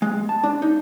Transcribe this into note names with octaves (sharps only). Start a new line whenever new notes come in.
G#3
A5
D4
D#4